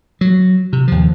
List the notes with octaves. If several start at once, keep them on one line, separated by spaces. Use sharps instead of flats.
F#3
C3
D#2 F3